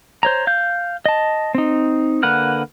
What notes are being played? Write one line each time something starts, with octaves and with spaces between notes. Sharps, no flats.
C5 C#5 A#5
F5 G6
D#5 A5
C4 D#4
D3 A#3 B4 F#5 F6